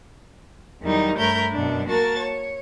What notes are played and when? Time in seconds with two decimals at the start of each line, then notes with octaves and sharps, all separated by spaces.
0.81 E2 D#3 F#3 G3 D#4
1.17 G2 A3 A#4 C#5 B5 G6
1.52 F#2 B2 F#3 D4
1.88 A#3 F#4 A#4 A5 C#6 A6
2.18 C#5